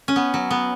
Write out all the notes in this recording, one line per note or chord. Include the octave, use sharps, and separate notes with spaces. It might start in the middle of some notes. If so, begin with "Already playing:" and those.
C#4
B3
F#3
B3